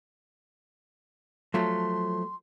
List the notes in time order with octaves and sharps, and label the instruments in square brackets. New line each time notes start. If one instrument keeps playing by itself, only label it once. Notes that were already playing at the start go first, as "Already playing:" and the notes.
[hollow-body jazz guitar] F3 F#3 A3 [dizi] C6